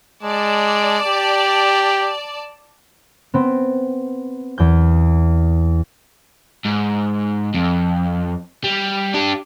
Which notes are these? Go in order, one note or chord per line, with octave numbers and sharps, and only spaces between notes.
G#3 D5 A5
G4
B3 C4
E2 G6
G#2
F2
G3
D4 G4